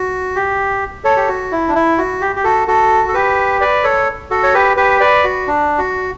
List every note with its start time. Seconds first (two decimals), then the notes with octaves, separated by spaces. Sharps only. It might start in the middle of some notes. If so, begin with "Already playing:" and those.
Already playing: F#4
0.36 G4
1.04 A4 C#5
1.16 G4
1.28 F#4
1.51 E4
1.68 D4
1.75 E4
1.98 F#4
2.21 G4
2.36 G4
2.44 F#4 A4
2.68 F#4 A4
3.09 A4
3.14 G4 B4
3.61 B4 D5
3.84 A4 C#5
4.31 F#4 A4
4.43 C#5
4.54 G4 B4
4.77 G4 B4
5.00 B4 D5
5.24 F#4
5.47 D4
5.78 F#4